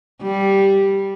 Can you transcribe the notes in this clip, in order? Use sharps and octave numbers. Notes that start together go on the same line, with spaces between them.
G3